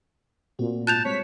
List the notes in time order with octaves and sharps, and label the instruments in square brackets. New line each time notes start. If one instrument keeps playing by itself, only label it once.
[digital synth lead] A#2 [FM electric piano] A3 C4 F#4
[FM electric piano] G#2 F4 [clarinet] A5 [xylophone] F#6 G6 F7
[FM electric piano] G3 G#3 C4 [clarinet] C#5 [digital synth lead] B6